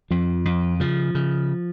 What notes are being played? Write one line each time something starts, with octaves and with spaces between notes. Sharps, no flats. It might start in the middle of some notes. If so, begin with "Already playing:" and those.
F2 F3
F2
C#3 F3
C#3